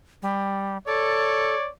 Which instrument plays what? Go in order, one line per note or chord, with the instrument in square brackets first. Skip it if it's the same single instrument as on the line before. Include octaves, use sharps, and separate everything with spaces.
[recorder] G3
[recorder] A4 [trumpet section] C#5 D5